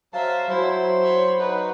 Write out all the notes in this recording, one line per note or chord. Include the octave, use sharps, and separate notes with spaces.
F#3 C5 E5 F5 A5
F#3 E4 C5 C6
C#5 B5
D#4 F#4 B4